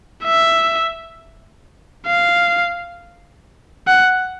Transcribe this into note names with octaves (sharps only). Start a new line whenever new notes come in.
E5
F5
F#5